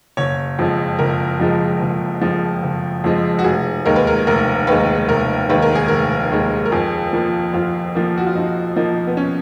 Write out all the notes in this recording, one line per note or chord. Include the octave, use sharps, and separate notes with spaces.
F#1 C#5
F2 F3 G#3
F#1 A#4
F2 F3 G#3
F#1
F2 F3 G#3
F#1
F2 F3 G#3
F#4
F1 G#4
D#2 D#3 G#3 A#4
B4
A#4
F1 A#4
D#2 D#3 G#3 B4
F1 A#4
D#2 D#3 G#3 B4
A#4
G#4
F1 A#4
D#2 D#3 G#3
A#4
F2 G#4
F3 A#3
F2 F4
F3 A#3
F#4
F4
F2 D#4
F3 A#3 D#4
B3
C#4